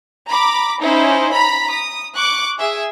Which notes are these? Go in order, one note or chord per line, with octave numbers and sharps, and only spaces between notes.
A#5 B5 D6
C#4 D#4 E4 C5
A#5 B5 B6
D#6
C#6 D6 F#6
G#4 E5